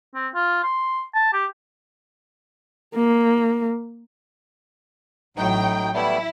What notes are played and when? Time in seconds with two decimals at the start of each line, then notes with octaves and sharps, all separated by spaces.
0.15 C4
0.35 F4
0.63 C6
1.15 A5
1.34 G4
2.95 A#3
5.37 A1 A2 F#3 D#4 G5
5.94 G3 A3 B3 E4